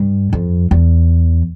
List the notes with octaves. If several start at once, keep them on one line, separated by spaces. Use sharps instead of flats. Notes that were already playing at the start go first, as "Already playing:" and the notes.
Already playing: G2
F2
E2